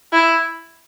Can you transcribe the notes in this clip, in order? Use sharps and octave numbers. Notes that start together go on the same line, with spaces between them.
E4